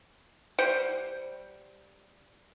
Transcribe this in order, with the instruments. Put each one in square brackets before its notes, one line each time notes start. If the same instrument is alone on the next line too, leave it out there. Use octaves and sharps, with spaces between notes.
[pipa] G3 C5 F#5 G5